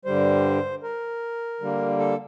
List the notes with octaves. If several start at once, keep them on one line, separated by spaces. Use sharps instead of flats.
G2 D3 G3 C5
A#4
D3 G3 A#3
A4